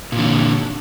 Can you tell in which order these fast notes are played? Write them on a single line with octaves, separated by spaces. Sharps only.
A#2 E3 D3